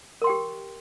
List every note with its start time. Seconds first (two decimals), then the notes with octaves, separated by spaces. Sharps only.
0.22 A#4
0.24 C6
0.27 G5
0.30 G4